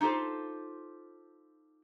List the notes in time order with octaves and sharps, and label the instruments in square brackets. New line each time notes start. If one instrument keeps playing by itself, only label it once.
[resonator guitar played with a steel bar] D#4 F4 G4 A4 C5